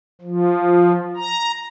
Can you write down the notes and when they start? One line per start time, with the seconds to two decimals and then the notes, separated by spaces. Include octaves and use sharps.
0.21 F3
1.17 A#5